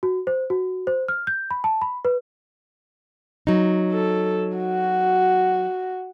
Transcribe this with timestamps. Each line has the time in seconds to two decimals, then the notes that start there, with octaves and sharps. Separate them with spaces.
0.03 F#4
0.27 C5
0.50 F#4
0.87 C5
1.08 F6
1.27 G6
1.51 B5
1.64 A5
1.82 B5
2.05 B4
3.47 F#3 D#4
3.93 A4
4.57 F#4